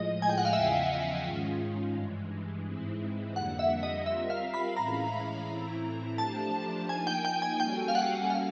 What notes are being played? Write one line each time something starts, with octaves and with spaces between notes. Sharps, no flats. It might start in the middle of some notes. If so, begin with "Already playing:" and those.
Already playing: A2 F3 G#3 D#5
G#5
G5
F#5
F5
E2 C#3 F3 E5
G#2 D#3 G#3 C#4 F4
G2 E3 G#3
G#2 E3 G#3 C4 E4
F2 D3 G3 A#3 F#5
E5
D#5
G3 C4 F4 A#4 E5
F5
B5
A2 E3 G#3 C#4 A#5
A2 E3 A3 C4 E4
F3 A3 D4 G4 C5 A5
F3 A#3 D#4 G#5
G5
G5
G#5
G3 A#3 C#4 F#4 A4 G5
F5
F#5
F5